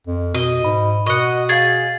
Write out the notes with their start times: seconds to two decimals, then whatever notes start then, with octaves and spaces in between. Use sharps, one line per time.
0.07 F2
0.34 B2 D#5
0.64 G#2 B5
1.06 B2 D#5 F#5 C#6
1.49 G#4 F5 A6